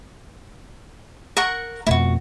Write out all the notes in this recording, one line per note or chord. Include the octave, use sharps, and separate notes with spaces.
A#4 F#5 C#6
F2 B2 A3 E4 F#4